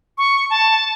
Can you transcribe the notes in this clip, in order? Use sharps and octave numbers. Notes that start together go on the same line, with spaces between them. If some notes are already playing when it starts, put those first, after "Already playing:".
C#6
A5